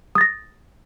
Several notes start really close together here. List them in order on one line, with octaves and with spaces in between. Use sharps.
D#6 A6 A#6